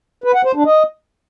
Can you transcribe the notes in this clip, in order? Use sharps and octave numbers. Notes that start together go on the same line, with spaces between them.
B4
F#5
C5
D4
D#5